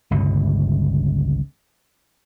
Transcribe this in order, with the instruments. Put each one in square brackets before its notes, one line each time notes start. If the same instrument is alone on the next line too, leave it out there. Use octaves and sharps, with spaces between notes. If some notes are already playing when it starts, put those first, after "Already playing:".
[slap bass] G1 C#2 G2 B2